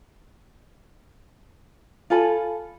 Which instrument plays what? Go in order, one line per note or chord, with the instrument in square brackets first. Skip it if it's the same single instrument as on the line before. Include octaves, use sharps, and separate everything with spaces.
[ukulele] F4 A4 G#5 B5